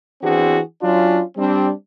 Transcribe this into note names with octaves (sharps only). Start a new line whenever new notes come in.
E3 B3 C4 D4 F#4 G#4
F#3 C#4 D4 F4
G3 C4 D4